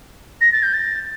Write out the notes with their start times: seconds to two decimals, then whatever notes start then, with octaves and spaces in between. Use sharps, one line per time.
0.41 A#6
0.52 A6
0.63 G6
0.73 A6